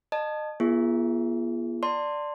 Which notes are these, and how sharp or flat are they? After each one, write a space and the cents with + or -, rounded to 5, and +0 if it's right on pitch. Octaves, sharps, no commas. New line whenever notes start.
D#5 -30 A5 +5
B3 -40 F4 -35 G#4 +0
D5 +5 A5 +35 C6 +0